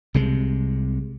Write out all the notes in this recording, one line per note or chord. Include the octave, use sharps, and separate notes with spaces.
C2 C3 G#3